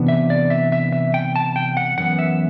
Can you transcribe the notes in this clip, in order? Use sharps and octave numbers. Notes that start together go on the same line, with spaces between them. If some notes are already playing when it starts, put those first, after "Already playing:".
Already playing: C3 E3 B3 D4
E5
D5
E5
E5
E5
G5
A5
G5
F#5
F#2 E3 B3 F#5
E5